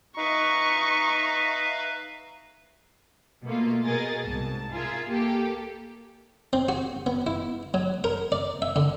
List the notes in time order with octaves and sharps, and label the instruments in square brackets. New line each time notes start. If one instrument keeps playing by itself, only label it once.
[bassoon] D#4 [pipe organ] B4 E5 F5 [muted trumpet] A#5 [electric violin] C#6
[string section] B2 A3 A#3 F4
B2 G#4 A#4 D#5 A6
C2 G#2 A5
F4 G#4 A#4 E5
A#3 G4 A4
[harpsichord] C4
F#4
B3
E4
F#3
A#4
D5
E5
D3